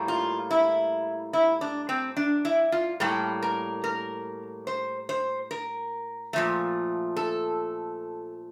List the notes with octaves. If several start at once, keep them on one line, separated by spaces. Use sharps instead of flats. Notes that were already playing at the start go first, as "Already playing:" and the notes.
Already playing: A2 G3 A#3
F4
E4
E4
D4
C4
D4
E4
F4
A2 G3 A#3 A4
A#4
A#4
C5
C5
A#4
A#2 F3 A3
A4